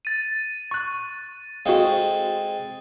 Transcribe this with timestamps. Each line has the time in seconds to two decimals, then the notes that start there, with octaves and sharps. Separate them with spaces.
0.05 A6 D#7
0.71 C#6 F#6
1.66 G#3 C4 F#4 A4 C5 F5